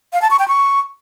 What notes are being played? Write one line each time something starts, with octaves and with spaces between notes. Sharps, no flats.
F5
A5
C#6
G5
C#6